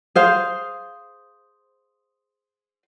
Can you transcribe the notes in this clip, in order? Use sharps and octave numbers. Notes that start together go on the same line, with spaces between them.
G#4 C5 F5